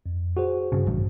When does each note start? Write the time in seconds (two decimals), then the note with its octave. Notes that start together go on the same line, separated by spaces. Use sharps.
0.06 F2
0.37 F#4 G#4 C5
0.72 G2 C#3
0.87 A1 G2